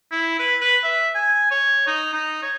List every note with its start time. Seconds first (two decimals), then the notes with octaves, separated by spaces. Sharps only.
0.12 E4
0.39 B4
0.61 B4
0.84 E5
1.15 G#5
1.51 C#5
1.87 D#4
2.13 D#4
2.42 C#5